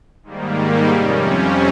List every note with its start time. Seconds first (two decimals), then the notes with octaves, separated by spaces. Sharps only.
0.23 G#2 D#3 G3 A#3
0.89 F2 C3 G3 C#4